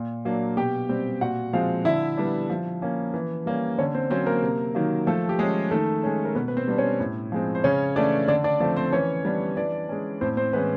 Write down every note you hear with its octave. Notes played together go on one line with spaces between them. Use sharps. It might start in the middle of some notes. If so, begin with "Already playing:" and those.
Already playing: A#2
F#3 A#3 D4
B2 G4 G5
G3 C4
A#2 F#4 F#5
F3 G#3 C4 F4 F5
D3 E4 E5
G3 B3 D4
F3
A#3 C#4
E3
G3 A#3 C#4
D3 C#4 C#5
C4 C5
F#3 A#3 C4 C#4 C5
A#3 A#4
C3
D#3 F#3 A#3
F3 A3 A4
G4
G#3 C#4 G#4
D#3 A3 A4
G#3 C#4
A#4
B2 B3 B4
B4
C4 C5
G3 B3 D4
C#4 C#5
A2
F3 G#3 C4
C5
C#3 C#4 C#5
E3 A3 C#4 D4 D5
D3 D4 D5
D4 D5
F3 A3 C4 D4 D5
C4 C5
E3 C#4 C#5
G3 B3 D4
E3 D4 D5
G#3 C#4
A2 C4 C5
C4 C5
E3 G#3 B3 C#4 B4